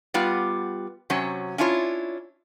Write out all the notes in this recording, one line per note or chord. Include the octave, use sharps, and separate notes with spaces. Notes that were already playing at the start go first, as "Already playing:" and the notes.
G3 B3 F4
C3 F#3 C#4
C#4 D4 E4 F4 C#5